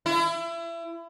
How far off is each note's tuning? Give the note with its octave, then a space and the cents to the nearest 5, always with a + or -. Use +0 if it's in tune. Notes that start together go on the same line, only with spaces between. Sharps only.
E4 +30